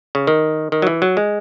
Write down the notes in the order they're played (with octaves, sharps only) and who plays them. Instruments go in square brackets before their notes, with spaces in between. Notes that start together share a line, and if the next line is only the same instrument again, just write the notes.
[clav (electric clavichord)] C#3
D#3
D#3
F#3
E3
F#3
G#3